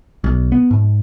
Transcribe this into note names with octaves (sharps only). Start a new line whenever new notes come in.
B1
B3
G#2